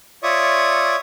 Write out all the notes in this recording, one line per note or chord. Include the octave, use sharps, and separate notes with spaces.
F4 C#5 D5 E5 C#6 D#6